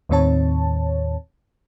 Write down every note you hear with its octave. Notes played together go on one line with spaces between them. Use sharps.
D#2 A2 D#3 C4 C#5 A5